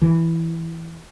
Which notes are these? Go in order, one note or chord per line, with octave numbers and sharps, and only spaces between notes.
E3